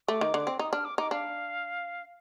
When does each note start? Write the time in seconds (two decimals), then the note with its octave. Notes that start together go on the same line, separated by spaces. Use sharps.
0.08 A3 D6
0.21 D#3
0.34 D3
0.47 C4
0.59 D#4 D#6
0.72 D4 F6
0.85 D6
0.98 D#4 D6
1.11 D4 F5